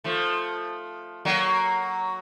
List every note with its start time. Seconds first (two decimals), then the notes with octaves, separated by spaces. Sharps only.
0.04 F3 A3
1.25 F#3 A#3